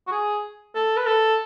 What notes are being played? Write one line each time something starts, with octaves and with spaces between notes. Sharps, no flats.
F#4
G#4
A4
B4
A4